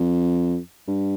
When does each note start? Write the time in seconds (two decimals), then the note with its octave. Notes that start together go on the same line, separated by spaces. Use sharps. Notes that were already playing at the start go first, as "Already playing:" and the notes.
Already playing: F2
0.88 G2